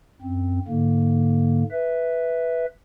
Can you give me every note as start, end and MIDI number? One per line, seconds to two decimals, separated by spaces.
0.22 0.59 42
0.22 0.59 60
0.68 1.63 44
0.68 1.63 50
0.68 1.63 58
1.71 2.66 71
1.71 2.66 76